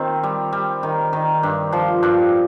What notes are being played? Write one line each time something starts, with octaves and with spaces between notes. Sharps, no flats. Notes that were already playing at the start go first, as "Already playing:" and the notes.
Already playing: D#3 C4 F4
G3
G3
D#3
D#3
G2
F3
G2